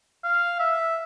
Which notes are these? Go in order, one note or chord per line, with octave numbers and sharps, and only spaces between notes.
F5
E5